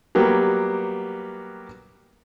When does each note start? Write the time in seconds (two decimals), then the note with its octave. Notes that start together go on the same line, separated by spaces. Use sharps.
0.15 F#3 G3 A#3 B3 G4